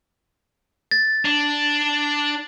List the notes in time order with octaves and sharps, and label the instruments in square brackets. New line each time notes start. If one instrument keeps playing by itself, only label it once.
[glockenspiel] A6
[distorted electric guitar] D4